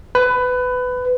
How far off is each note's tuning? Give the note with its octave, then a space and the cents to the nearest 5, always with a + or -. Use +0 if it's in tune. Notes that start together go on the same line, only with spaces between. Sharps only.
B4 +20